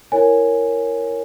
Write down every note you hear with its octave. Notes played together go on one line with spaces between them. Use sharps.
E4 A#4 C#5 G#5